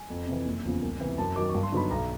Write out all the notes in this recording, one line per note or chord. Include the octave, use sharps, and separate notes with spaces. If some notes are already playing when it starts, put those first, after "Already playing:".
Already playing: G#5
F2
C3 E3
F#1
E2 C#3 F3
C2
C3 E3
F#2 A5
D#3 F#3 D6
C#6
G2
C6
D3 F#3 B3 D#4 B5
B1 A#5